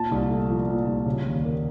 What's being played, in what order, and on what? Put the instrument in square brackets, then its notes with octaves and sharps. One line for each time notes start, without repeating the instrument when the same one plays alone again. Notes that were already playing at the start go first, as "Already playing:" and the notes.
Already playing: [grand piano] A#2 A5
C2
A3
F3
A#2
C2
C#3
D#2
A#3